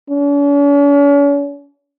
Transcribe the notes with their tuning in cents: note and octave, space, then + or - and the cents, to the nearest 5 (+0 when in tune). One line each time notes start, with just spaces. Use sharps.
C#4 +45